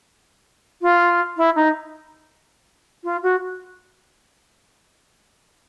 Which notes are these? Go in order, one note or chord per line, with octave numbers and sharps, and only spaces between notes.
F4
E4
D#4
F4
F#4